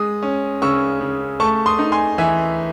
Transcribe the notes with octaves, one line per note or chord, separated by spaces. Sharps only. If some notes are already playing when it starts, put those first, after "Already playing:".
Already playing: G#3 D#6
C#4
C#3 C#6 E6
C#3
A3 A5 C#6
C6 D#6
D#4
G#5 C6
E3 E5 G#5